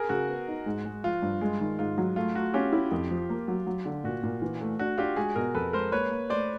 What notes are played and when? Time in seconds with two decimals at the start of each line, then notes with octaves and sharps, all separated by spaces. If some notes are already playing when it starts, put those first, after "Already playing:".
Already playing: G#4 A#4
0.09 C#3 F#4
0.28 B3
0.47 D#4
0.66 G#2
0.85 G#3
1.04 F3 F4
1.22 G2
1.41 G#3
1.60 D#3
1.79 G#2 F4
1.98 F#3
2.16 A3 F4
2.35 A3 F#4
2.54 C#4 F4 G4
2.72 E4
2.91 F2
3.11 F3
3.29 A#3
3.48 F#3
3.67 F#3
3.86 D3
4.04 A#2 F#4
4.23 A#2
4.42 E3
4.61 A3
4.79 D4 F#4
4.98 D4 F4 G4
5.16 G#3 F#4 G#4
5.35 B2 G#4 A#4
5.54 F2 A4 B4
5.73 G#3 A#4 C5
5.92 A#3 B4 C#5
6.11 A#3
6.30 A3 C5 D5